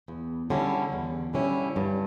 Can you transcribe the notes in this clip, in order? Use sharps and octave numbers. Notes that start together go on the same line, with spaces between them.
E2
D3 G3 C#4 E4
E2
D3 G3 C#4 E4
G2